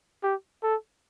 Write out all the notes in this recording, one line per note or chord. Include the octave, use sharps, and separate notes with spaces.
G4
A4